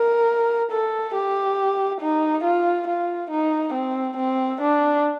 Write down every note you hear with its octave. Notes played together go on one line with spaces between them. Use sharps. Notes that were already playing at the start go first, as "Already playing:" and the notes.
Already playing: A#4
A4
G4
D#4
F4
F4
D#4
C4
C4
D4